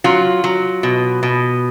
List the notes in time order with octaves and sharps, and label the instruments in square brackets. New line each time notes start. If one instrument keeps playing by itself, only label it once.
[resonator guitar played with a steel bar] F#3 F4
F#3
B2
B2